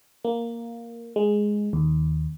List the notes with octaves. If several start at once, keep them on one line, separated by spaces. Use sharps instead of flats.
A#3
G#3
D#2